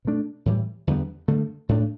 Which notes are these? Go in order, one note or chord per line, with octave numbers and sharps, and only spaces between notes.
B2 A3 D4
A2 E3 G3
E2 D3 G3 B3
G2 D3 A3
A2 A3 D4